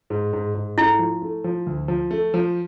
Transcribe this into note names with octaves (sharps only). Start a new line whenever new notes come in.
G#2
G#2
G#2
A3 E4
F3
A3
F3
D2
F3
A3
F3